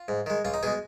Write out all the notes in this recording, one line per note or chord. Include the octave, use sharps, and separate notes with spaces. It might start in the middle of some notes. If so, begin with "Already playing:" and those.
Already playing: F4
G#2
D#3 G#3
C#2 F4
D#4
B2 G#3 G#4